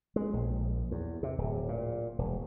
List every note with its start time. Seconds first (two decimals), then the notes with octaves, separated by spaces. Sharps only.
0.16 G#3
0.33 A#1
0.91 E2
1.23 C3
1.38 D1
1.69 A#2
2.18 E1